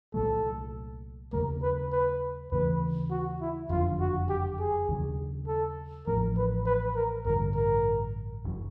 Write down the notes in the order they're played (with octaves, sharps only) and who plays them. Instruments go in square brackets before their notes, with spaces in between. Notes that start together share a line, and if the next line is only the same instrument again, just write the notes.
[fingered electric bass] C2 A#2 F#3 A3 [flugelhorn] A4
[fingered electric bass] D#2 C#3 F#3 A3 [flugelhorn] A#4
[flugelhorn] B4
B4
[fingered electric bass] D#2 C#3 E3 A3 [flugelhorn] B4
[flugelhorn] F#4
E4
[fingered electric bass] F#1 F2 D3 F#3 [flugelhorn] F4
[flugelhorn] F#4
G4
G#4
[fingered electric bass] D#2 C#3 F#3
[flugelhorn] A4
[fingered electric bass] A1 A2 F3 A3 [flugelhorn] A#4
[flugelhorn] B4
B4
A#4
[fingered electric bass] A1 G2 D3 G3 [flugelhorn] A#4
[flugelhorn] A#4
[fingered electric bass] F#1 C#3 F#3